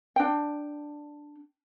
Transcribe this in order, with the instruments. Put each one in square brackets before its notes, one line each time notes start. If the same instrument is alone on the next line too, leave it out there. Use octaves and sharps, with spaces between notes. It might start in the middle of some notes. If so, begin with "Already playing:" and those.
[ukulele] D4 G5